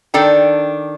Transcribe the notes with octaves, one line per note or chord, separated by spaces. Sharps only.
D#3 D4 A4 G5